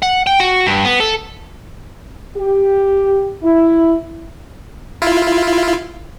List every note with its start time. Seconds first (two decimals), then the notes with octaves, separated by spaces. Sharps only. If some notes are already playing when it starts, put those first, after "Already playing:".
0.02 F#5
0.27 G5
0.40 F#4
0.66 G2
0.85 B3
1.00 A4
2.36 G4
3.43 E4
5.02 E4 F4